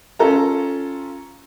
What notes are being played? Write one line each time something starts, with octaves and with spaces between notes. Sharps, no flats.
C#4 F4 A4 A#5